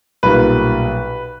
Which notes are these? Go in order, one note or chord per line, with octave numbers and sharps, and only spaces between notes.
B1 A#2 G3 A#3 B4